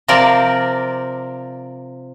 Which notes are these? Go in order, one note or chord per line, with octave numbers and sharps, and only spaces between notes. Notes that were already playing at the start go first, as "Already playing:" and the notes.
C3 F3 C4 A#4 D5